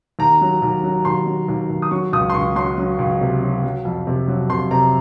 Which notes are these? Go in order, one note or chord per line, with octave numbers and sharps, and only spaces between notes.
D#2 A#5
F#3
D#2
F#3
D#2 C6
F#3
D#2
D#2
D#6
F#3 C#6
C#2 D#6
C6
C#2 C#6
F#3 C6
F#3
C#2
C3
F#3
F#3
F2
C3
F#3
C3 C6
C3 A#5